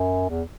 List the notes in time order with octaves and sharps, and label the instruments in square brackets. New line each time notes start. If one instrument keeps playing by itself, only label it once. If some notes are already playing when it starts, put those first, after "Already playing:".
Already playing: [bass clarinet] F#2
E2